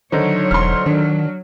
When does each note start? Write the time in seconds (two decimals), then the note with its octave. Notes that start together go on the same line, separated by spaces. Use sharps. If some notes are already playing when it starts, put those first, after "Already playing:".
0.12 D3 D#3 F#3 D#4 C5 C#5
0.51 E1 C6 F6
0.86 D#3 F#3 D4